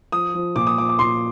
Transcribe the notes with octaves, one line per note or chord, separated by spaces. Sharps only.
F3 D#6
F3
A#2 D6
D#6
F3 D6
D6
A#2 C6